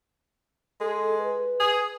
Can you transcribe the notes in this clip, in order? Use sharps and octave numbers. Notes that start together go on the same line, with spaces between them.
G#3 A4
B4
G#4